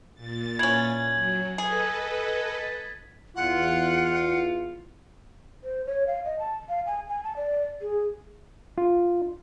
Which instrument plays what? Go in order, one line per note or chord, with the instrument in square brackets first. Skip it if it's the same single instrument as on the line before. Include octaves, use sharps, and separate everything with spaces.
[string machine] A#2 A6
[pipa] E3 C#4 [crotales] G#6 F#7
[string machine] F#3
[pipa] G#4 [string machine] A4 B4 D#5
[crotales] A6 B6
[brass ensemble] E2 F4 [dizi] F#5
[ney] C5
C#5
F5
D#5
A5
F5
G#5
G#5
A5
D5
G#4
[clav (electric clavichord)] F4